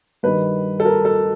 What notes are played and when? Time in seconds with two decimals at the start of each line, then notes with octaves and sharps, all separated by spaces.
0.23 G2 D#3 G3 B4
0.80 A4
0.85 A#4
1.05 A4